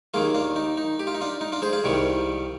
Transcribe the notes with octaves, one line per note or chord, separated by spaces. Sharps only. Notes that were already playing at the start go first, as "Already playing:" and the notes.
D#2 D#3 A#3 F4 G#4
D4 F4
D#4
D#4
G4
F4
D#4
D4 F4
D#4
D4 F4
G#4 C5
F4 G#4
C2 C3 D#3 G3